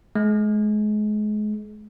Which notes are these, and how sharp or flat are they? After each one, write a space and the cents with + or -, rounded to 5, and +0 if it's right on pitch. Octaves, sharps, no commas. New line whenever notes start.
G#3 +30